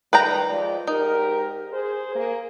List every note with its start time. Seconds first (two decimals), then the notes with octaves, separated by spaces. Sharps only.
0.13 G#2 D#3 G3 B4 G5 A#5
0.49 F3 G#3 D5
0.87 G#2 D#4 G4 A#4
1.71 G#4 C5
2.14 A#3 G#4